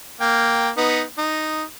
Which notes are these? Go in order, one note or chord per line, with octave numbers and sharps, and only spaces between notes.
A#3 G5
B3 D#4
D#4